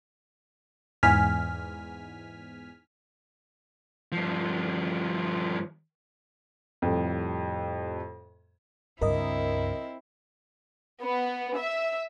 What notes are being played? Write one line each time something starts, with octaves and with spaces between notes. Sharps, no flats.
E2 G#2 G#5 F6 B6
G2 F3
F2 A2 C3 G3
C#2 G2 C4 E4 A#4 D#5
B3
E5